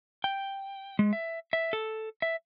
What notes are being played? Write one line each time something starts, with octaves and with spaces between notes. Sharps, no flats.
G5
G#3
E5
E5
A4
E5